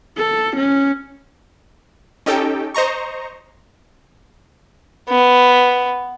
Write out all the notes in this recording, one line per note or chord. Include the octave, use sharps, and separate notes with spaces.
A4
C#4
C#4 D#4 G4 A4 G5
C5 D#5 A#5 C#6
B3